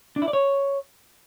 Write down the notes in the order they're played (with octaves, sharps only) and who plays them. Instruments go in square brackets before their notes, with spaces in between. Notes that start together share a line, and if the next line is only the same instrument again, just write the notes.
[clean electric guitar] D4
E4
D5
C#5